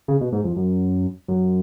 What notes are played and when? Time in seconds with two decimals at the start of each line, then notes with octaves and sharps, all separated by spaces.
0.08 C#3
0.21 B2
0.32 G#2
0.44 F2
0.56 F#2
1.28 F#2